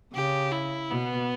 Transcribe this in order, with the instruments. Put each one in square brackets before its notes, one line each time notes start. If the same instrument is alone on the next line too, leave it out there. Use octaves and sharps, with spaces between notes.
[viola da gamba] C#3 [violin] G4
[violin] E4
[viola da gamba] B2 [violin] B3